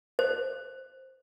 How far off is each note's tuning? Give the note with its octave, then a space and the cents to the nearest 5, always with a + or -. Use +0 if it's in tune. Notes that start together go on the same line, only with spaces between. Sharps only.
C5 +0